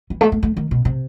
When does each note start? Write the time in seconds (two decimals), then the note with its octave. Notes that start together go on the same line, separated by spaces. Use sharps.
0.10 E3
0.21 A3
0.32 A3
0.43 A3
0.57 D#3
0.71 B2
0.85 C3